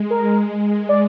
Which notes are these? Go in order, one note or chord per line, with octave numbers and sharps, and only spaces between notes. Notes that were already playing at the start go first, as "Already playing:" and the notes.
Already playing: G#3
A#4
D5